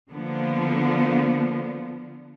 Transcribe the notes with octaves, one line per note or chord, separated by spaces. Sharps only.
D3 F3 A#3 B3